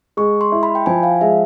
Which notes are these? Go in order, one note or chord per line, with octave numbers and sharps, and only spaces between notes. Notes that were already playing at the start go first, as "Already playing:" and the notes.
G#3 C#6
C6
E4
B5
G5
F3 G#5
F5
G#3 E5